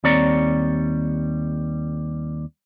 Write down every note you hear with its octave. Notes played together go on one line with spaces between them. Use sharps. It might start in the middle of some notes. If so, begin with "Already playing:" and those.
D#2 G3 C4 C#5 D5 A#5